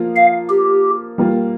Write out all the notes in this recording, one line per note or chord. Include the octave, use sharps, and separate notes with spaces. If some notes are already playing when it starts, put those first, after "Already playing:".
Already playing: F3 A#3 F4
F5
G4
G3 A#3 F4